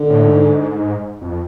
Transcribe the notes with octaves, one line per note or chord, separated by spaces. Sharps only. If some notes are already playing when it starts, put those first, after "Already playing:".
Already playing: D3
A2
G#2
F2